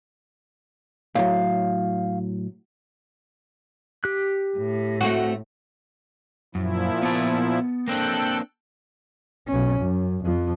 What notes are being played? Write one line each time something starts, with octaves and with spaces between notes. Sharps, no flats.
A2 F#3 F5
G4 F#6
A2
A3 C4 F#4
F#2 A#2 F3 E4
B3 A5
A#3 C4 D4 A4 G5 F#6
B1 C#4
F#2
F2 F3